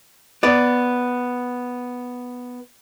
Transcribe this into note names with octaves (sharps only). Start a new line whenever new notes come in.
B3 D5